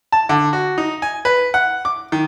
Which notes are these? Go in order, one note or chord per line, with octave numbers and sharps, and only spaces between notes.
A5
D3
F#4
D#4
G#5
B4
F#5
D6
D#3